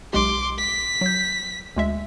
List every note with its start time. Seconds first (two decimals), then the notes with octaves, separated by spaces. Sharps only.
0.13 B1 G#3 G4 C6 D6
0.58 B6
1.01 F#3 G6
1.77 D2 G#3 E5